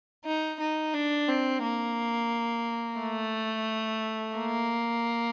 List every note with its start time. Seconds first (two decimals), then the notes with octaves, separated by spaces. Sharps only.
0.25 D#4
0.60 D#4
0.94 D4
1.28 C4
1.63 A#3
3.00 A3
4.37 A#3